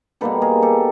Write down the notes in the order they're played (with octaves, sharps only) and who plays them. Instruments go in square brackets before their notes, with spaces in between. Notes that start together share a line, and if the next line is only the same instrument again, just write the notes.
[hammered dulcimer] B2 G3 A#3 D#4 A4 B4
G#4 A#4
G4 A4